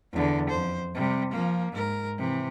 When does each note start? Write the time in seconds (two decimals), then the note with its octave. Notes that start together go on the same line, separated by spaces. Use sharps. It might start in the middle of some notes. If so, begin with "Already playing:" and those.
0.13 E2 D3
0.50 F2 C5
0.95 C3 G3
1.31 F3 A#3
1.71 G#2 A#4
2.18 C3 E3